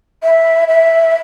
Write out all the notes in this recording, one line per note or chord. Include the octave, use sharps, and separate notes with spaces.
E5
E5